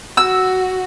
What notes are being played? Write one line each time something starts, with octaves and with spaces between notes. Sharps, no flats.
F#4 E6